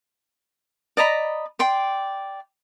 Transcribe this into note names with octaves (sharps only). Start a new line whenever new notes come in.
D5 D#5 A#5 B5
D5 G5 C6